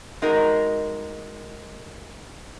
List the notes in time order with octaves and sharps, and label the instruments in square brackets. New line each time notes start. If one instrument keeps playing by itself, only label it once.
[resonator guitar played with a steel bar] G#3 D#4 F#4 A#4